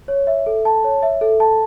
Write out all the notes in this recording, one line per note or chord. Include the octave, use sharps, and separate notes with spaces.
C#5
E5
A4
A5
C#5
E5
A4
A5